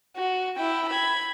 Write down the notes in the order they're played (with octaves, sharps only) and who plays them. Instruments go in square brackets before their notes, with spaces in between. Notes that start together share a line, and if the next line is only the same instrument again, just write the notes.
[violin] F#4
E4 G5
B5 G#6